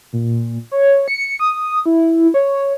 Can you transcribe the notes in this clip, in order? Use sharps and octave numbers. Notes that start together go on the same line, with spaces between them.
A#2
C#5
C#7
D#6
E4
C#5